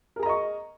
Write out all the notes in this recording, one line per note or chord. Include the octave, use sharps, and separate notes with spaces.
G#4 A#4 D#5 A#5 C#6